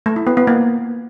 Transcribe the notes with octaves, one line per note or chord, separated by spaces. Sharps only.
A3
E4
B3
B3
A#3